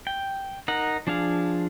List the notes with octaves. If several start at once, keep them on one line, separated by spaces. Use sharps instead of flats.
G5
D#4 A#4 F#5
F3 D4 G#4 F5